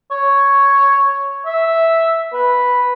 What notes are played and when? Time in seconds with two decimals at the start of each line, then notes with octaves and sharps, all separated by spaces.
0.11 C#5
1.46 E5
2.33 B4